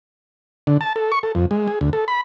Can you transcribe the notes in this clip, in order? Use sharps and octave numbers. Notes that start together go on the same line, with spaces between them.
D3
A5
A4
C#6
A4
F2
G#3
G#4
D2
A4
B5